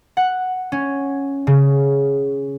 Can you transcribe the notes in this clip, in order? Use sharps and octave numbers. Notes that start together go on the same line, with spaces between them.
F#5
C#4
C#3